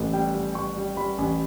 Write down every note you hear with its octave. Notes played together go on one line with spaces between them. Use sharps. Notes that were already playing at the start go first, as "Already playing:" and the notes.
Already playing: A1 A2 A4
G3 G5
G3
G3 C#6
G3
G3 B5
A1